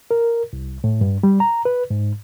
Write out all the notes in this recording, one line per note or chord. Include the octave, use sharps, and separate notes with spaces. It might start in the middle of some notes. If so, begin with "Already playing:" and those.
A#4
C2
A2
G2
G3
A#5
B4
G#2